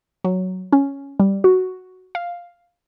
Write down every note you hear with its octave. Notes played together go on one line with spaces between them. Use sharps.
F#3
C#4
G3
F#4
F5